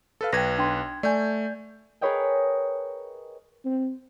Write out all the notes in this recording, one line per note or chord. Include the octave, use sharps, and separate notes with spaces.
A4 B4 F5
B1 B4 G5 G#6 A#6
D4 G5 C6
A3 D5 G#5 G6
G#4 A#4 B4 C#5 D#5 G5
C4